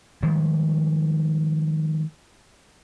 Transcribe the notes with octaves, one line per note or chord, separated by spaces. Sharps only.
D#3 F3 G3 G#3